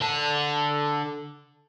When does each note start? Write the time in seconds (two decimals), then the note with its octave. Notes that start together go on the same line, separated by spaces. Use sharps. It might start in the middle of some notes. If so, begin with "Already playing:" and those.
0.01 D3 A5